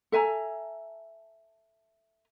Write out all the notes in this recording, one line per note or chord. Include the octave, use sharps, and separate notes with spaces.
A4 E5 G#5 A#5